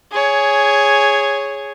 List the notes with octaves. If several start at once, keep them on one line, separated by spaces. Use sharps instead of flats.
G#4 C#5